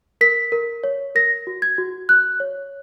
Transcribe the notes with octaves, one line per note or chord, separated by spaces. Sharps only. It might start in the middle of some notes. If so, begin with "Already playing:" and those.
A#4 B6
A#4
C#5
A#4 A#6
F#4
G#6
F#4
F#4 F#6
C#5